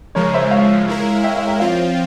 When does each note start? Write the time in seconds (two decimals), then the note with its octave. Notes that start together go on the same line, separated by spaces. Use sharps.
0.15 C#3 F3 G#3 A#4 C#5
0.34 C5 E5
0.51 C#5 F5
0.88 G#3 E4 A#4
1.24 E5 G5
1.36 C#5 F5
1.48 E5 G5
1.60 F3 C4 F4 C#5 F5